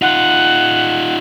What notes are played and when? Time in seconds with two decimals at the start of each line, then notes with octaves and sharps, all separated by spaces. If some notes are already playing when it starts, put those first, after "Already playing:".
0.02 D#4 F4 F#5